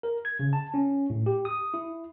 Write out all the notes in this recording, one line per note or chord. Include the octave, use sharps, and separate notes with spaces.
A#4
G#6
C#3
A5
C#4
A2
G4
D#6
E4